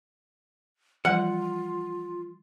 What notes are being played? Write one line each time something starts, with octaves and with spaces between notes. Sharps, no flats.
E3 F3 G3 F4 F#5